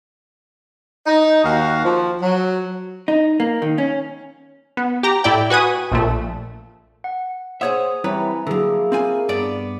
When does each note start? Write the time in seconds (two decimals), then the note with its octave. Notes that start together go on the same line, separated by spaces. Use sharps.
1.06 D#4
1.44 D#2 F#4 F5
1.84 F3
2.21 F#3
3.08 D#4
3.40 A#3
3.62 D#3
3.78 C#4
4.77 B3
5.03 G4 A#5
5.24 A2 E4 D5 G5
5.50 F#4 B4 G#5 D#6
5.91 A#1 A#2 A3
7.04 F#5
7.61 G#4 C5 C#5 E5 F#5 D#6
8.04 E3 G3 C4 E4 B4 C#5 A#5
8.47 D3 F#3 A#3 E4 G#4 A4
8.92 C4 F4 G#5
9.29 G2 B3 D5